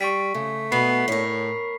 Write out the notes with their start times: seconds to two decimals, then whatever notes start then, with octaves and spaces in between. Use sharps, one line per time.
0.01 G3 C#6 B6
0.34 C#3 A3
0.72 B2 B3 B5 C7
1.08 A2 A#4 C#5 B6